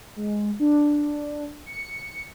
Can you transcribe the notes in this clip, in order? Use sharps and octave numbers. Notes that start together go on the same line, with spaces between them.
G#3
D4
C#7